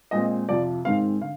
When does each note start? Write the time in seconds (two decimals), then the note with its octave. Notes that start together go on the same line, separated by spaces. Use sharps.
0.11 A#2 G#3 C4 D#5
0.49 F2 C3 F3 D5
0.85 G#2 D#3 G#3 C4 F5
1.21 D3 F5